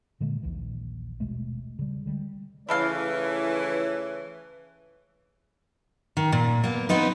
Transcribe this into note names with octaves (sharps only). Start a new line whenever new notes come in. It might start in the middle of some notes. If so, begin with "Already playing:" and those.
A#2 D3 G#3 A#3
A#1 D#2 E3
D#1 B2 G#3 A3
C#3 G3
D3 G3 G#3
C#3 E3 F3 A3 E4 A4 C#5 F5
D#3
A#2
A#3 B3
B3 C4 D#4 B4